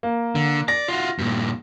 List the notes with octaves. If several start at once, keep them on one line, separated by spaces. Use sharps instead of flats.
A#3
D3
D5 A#6
F4 F#4
G2 A#2